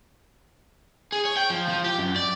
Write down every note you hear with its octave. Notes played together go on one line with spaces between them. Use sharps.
G#4
C#5
G5
F3
F3
G4
F#2
D5